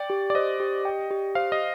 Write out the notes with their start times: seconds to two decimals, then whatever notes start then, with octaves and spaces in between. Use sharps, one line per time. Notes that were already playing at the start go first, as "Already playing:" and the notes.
Already playing: D5 G5
0.10 G4
0.30 D5
0.35 C5 D#5
0.60 G4
0.85 G5
1.11 G4
1.35 C5 F5
1.52 D#5